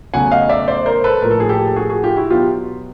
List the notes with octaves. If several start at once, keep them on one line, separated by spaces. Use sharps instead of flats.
E2 C#3 F#3 A3 F#5 G#5
D#5 F5
D5 E5
C5 D5
A#4 C5
A4 B4
A2 F3 A#3 A#4
A4
G#4
G4 A4
A4
F#4 G#4
F#4 G#4
F4 G4
E4 F#4
B2 F#3 B3 F4 G4